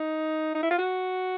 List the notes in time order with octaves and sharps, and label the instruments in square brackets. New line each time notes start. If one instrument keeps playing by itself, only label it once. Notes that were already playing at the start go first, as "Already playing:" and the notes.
Already playing: [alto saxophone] D#4
D#4
E4
F4
F#4